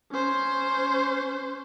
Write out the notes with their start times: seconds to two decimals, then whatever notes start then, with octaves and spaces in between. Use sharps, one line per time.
0.11 C#4 C5